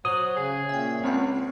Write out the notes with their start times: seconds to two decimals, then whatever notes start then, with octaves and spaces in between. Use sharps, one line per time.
0.05 F#3 C5 D#6 F#6
0.37 C#3 G#4
0.69 A#2 C#4 E5 G5
1.04 C#2 C4 F#5